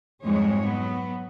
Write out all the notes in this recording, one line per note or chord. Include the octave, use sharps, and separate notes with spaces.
F2 G#2 G3 G#3 C#5
F#3 B3